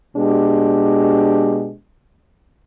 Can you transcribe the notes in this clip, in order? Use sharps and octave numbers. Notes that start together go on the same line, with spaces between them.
B2 G#3 D4 G4